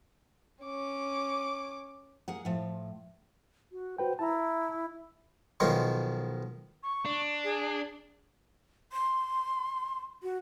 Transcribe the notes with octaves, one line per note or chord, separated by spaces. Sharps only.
C#4 D6
A#3 G#4 F#5
A2 F3
F#4
F#4 B4 C5 G5
E4 A5 A#5
B1 D#3 F3 G#3 F4 C#5
C#6
D4
G#4
C6
F#4